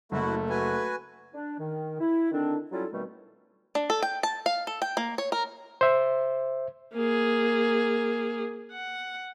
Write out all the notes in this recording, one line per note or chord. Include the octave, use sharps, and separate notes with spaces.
F#1 A3 E4 F#4
F#4 B4 G#5
D4
D#3
E4
D3 D#3 C4 D4
F#3 G3 C#4 E4 F4 A4
B2 D#3 G3 A3 C4
D4
A4
G5
A5
F5
A4
G5
A#3
C#5
A#4
C5 E5
A#3 G#4
F#5